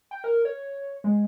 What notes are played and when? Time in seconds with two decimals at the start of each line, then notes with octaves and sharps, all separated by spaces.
0.11 G5
0.24 A#4
0.45 C#5
1.04 G#3